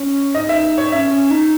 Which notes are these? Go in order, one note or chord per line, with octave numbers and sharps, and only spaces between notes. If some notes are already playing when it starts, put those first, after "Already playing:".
Already playing: C#4
D#4 D#5
E5
C#5
C#4 E5
C#4
D#4